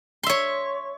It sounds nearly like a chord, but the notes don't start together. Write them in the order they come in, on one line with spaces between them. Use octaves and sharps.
C6 E5 C#5